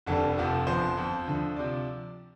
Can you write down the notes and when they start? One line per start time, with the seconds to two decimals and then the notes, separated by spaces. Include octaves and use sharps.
0.06 F1 F2 D3 G3 A4
0.38 F1 F2 C3 F3
0.67 G1 F2 F3 C5
0.97 F2 F3
1.27 D2 D3 F3
1.56 C3 F3 D5